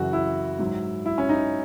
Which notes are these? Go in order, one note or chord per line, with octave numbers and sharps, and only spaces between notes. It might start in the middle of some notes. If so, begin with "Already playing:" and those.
Already playing: F#2 C#3 E3 F#4
E4
G#2 F#3
E4
C#4
D#4